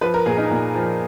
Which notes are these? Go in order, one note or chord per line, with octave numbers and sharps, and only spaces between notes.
F3 B4
A#4
A#2 G#4
D#4
A#2
F3